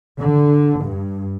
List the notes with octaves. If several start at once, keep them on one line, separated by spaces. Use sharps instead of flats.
D3
G2